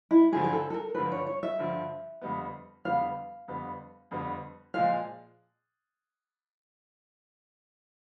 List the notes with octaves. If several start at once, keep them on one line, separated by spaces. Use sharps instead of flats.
E4
G2 D3 F3 G#4
G#4
A4
A4
A#4
G2 D3 F3 B4
C#5
C#5
E5
G2 D3 F3
F2 D3 G3 B3
F2 D3 G3 B3 F5
F2 D3 G3 B3
F2 D3 G3 B3
A#2 F3 G#3 F5